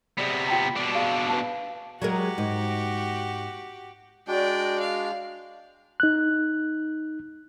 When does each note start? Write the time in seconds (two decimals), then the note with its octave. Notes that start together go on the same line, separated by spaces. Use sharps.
0.18 C3 B3 G#4 D5
0.48 F4 G5 A#5
0.76 B2 D4
0.94 G#4 F5
1.29 B4 F5 A5
2.02 F#3 G#3 F#4 G4 A#4
2.38 G#2
4.27 G#3 D4 F#4 D5 G5
4.80 F5
6.00 D#4 F#6